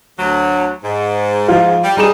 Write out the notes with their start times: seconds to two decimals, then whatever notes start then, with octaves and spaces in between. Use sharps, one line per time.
0.18 D2 F#3
0.84 G#2
1.48 F3 F4
1.84 G3
1.97 G3 D#4 G#4 E7